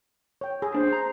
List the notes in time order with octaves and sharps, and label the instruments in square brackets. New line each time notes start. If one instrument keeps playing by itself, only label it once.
[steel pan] C#5 G5
G#4
[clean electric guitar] D#2 D4 [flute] C5
[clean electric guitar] A#5